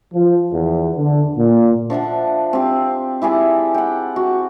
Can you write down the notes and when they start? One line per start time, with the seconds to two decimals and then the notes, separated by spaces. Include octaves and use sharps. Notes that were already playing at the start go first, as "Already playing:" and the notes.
0.14 F3
0.52 E2
0.97 D3
1.37 A#2
1.90 F3 D4 E5 F#5
2.53 C4 G4
3.22 E4 G4 G#4 D5
3.74 F#5 G5
4.16 F#4